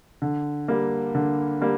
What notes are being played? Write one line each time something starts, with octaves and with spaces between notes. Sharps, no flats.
D3
G3 A#3
D3
G3 A#3